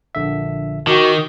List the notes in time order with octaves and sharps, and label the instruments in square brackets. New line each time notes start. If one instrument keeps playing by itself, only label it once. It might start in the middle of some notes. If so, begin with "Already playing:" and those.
[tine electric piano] A#1 D3 E5
[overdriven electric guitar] D#3 [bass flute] F#4 [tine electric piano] G5 D6